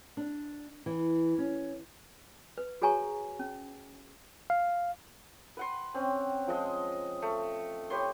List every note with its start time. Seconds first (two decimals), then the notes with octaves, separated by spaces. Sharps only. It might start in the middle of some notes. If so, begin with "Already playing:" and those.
0.17 D4
0.86 E3
1.38 C#4
2.58 B4
2.82 F#4 G#4 C#5 G#5 A#5 C#6
3.39 C#4
4.50 F5
5.57 B4 F#5 C6
5.94 C4 C#4
6.47 F3 G#3 D#5
7.22 A3
7.90 G4 B4 C#5 C6